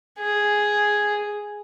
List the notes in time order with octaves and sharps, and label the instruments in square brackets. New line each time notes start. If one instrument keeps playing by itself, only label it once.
[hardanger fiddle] G#4